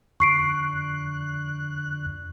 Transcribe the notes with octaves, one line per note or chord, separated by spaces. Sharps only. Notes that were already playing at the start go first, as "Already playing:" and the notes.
F2 D3 C#6 F#6 C7 D7